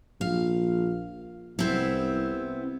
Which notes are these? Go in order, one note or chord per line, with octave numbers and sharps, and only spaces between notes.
A#1 F5
C2 B3 C4 E4